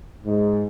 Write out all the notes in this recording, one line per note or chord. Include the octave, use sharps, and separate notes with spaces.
G#2